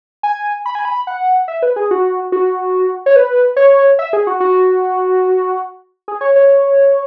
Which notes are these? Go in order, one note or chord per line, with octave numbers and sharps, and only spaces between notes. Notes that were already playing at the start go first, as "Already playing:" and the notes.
G#5
B5
G#5
B5
F#5
E5
B4
G#4
F#4
F#4
C#5
B4
C#5
E5
G#4
F#4
F#4
G#4
C#5
C#5